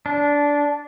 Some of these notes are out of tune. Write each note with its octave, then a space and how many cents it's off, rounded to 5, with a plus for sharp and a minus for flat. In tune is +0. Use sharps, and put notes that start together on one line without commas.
D4 -15